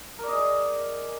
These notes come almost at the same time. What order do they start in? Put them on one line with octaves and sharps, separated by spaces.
A#4 D5 D#5 G#4